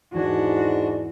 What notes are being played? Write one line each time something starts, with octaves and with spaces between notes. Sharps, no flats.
E2 G#2 D4 F#4 G#5